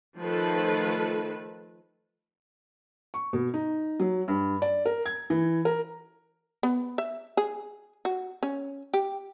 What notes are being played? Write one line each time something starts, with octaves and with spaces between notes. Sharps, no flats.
D#3 F3 A3 A4 B4
C#6
B2
D#4
F#3
G2
D5
A#4
G#6
E3
A#4
B3
E5
G#4
F#4
C#4
G4